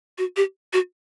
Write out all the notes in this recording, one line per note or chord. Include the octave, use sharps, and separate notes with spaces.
F#4
G4
F#4